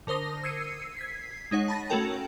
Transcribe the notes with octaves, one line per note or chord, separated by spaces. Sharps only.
D3 A#4 C5 D#6 A#6
E6 G#6 C7 C#7 D#7
G#6 B6 C7
G#3 D#4 C#5 F#5
A5 B5 A6 A#6
A3 C#4 F#4 A4 A#4 G5